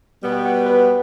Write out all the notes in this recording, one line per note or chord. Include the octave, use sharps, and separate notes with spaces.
B2 G3 B3
G5
F#5
B4